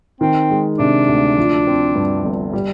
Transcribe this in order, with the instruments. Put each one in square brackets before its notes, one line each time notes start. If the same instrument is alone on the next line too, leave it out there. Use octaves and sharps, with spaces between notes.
[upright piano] D#3 [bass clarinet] C4
[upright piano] G#3
[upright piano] C3 [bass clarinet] D4
[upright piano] D2
F3
C4
G2
G1
G3